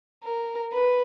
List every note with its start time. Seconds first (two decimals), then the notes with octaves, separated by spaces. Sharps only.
0.24 A#4
0.73 B4